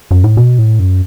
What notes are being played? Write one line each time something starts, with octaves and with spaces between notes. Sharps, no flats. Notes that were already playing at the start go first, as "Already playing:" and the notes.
F#2
A2
B2
A2
F#2